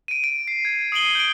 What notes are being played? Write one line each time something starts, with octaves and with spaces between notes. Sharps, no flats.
D7 D#7
D7
C7
G#6
D#6 C7 D7 D#7 F#7 G7
G6 D7